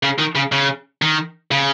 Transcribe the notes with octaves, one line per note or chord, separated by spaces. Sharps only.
C#3
D#3
C#3
C#3
D#3
C#3